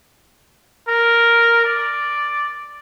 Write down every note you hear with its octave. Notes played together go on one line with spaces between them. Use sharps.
A#4
D5